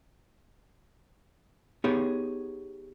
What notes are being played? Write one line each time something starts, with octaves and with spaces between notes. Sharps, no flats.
B3 D#4 G4 G#4 C#5